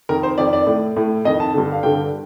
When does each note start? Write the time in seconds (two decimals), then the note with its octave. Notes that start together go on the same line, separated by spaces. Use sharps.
0.09 F2 D#3 A#4
0.23 C5
0.38 F2 D#3 D5
0.53 D5
0.67 A2
0.96 A2
1.25 F2 D#3 D#5
1.40 A5
1.54 G2 D3
1.72 F5
1.83 G2 D3 G5